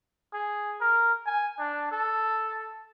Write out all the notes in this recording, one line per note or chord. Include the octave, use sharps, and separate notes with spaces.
G#4
A#4
G#5
D4
A4